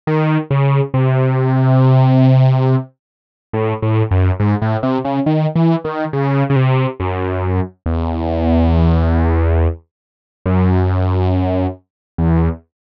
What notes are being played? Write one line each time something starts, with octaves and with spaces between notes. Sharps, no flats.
D#3
C#3
C3
A2
A2
F#2
G#2
A2
C3
C#3
D#3
E3
D#3
C#3
C#3
C3
F#2
E2
F#2
E2